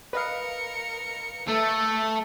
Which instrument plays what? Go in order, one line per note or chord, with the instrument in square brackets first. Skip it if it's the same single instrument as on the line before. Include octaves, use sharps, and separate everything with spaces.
[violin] A#4 C#7 [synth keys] B4 D#5 F5
[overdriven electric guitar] A3 [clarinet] A4